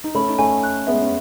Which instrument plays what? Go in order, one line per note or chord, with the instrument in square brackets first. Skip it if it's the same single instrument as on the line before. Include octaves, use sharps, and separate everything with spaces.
[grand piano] D#4
[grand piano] A3 C#4 [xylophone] B5
[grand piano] D#4
[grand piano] A3 C#4 [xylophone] G#5
[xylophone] F#6
[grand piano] G#3 B3 [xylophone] E5
[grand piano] C#4